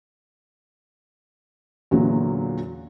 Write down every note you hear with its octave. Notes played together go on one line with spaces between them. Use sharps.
E2 A#2 D3 F#3